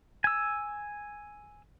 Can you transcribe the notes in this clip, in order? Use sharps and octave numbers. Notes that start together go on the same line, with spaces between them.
G#5 E6